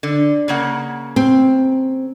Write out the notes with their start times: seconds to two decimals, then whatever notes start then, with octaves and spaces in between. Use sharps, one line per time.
0.03 D3
0.48 C#3 A#3 F#5
1.16 C4